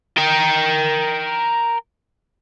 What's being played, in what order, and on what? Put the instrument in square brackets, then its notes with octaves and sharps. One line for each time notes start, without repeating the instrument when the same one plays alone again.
[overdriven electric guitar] A#4 G5